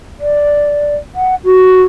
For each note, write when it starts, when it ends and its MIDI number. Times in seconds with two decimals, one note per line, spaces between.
0.20 0.95 74
1.15 1.35 78
1.44 1.82 66